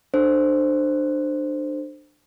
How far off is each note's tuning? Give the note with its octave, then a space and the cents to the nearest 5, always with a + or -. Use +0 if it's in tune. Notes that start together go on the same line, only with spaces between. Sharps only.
D4 +25 A4 +5 C5 +0